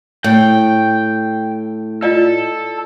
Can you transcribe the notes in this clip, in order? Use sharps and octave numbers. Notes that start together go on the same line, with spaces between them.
A2 G5
F4 A4 D5 D#5